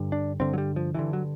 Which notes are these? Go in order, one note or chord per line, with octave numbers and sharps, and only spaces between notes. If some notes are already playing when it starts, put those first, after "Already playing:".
Already playing: G2 D3
D4
G2 D3 C4
F#3
G3
F3
G2 D3 E3
F#3